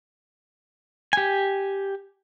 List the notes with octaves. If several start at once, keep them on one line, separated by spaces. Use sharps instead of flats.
G4 G#5